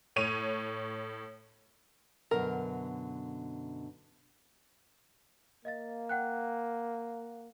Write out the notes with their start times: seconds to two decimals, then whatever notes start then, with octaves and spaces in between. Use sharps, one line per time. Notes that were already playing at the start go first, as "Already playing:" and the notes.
0.16 A2 C#5 D#7 F7
2.31 F#2 B2 D3 A#4
5.65 A#3 D#5 F5 A6
6.09 F#5 G5 F#6